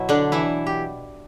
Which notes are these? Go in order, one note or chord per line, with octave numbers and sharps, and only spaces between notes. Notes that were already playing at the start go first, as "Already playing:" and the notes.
Already playing: B2 F#3 E4
D3 D4
E3 E4
G4